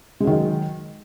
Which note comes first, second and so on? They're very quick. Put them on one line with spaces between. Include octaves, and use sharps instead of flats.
G#3 F#3 D#3